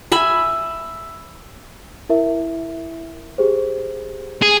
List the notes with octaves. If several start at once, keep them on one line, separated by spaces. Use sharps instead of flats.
E5 G#5 B5
E4 A#4 E5
G4 G#4 C5
G#4